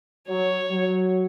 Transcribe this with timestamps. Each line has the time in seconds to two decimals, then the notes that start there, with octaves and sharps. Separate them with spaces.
0.29 F#3 C#5
0.71 F#3